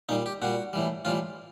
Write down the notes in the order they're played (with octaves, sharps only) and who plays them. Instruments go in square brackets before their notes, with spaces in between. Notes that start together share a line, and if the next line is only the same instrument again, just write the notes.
[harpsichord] A#2 G3 D#4
G4
A#2 G3 F#4
A2 E3 G3
A2 E3 G3 F4